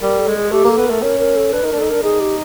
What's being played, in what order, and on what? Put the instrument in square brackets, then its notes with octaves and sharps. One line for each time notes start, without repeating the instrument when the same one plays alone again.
[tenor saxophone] G3 [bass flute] A#4
[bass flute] A4
[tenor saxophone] G#3
[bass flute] G#4
[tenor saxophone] A3 [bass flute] G4
[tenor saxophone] A#3
[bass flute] A4
[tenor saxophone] B3
[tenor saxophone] A3 [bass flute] A#4
[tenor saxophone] C#4 [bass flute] A#4
[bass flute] A#4
A4
[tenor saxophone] D4 [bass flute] B4
[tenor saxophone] D#4 [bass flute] A#4
[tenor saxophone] D4
[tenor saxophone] D#4 [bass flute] A4
[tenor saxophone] D4 [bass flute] A#4
[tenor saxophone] D#4 [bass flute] G#4
[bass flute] G4